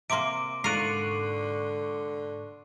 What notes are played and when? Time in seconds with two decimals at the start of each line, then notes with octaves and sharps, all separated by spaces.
0.10 C3 A#3 C6 D6 D7
0.64 G#2 D3 F4 A#4 C#6 F#6 C7 D#7